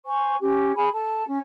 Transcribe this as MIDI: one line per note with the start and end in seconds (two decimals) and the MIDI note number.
0.06 0.35 72
0.06 0.35 80
0.06 0.35 85
0.40 0.72 61
0.40 0.72 67
0.76 0.89 68
0.76 0.89 80
0.76 0.89 83
0.92 1.24 69
0.92 1.24 81
1.26 1.38 61